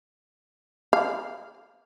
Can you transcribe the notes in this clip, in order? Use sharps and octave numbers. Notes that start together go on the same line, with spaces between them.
F5